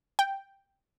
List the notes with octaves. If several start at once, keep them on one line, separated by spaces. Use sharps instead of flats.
G5